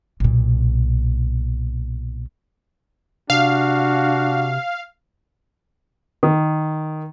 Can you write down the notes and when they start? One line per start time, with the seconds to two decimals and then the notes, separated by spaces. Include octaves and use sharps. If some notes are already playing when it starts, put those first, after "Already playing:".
0.20 B1 A#2
3.30 C3 D4 F#4 F5
6.23 D#3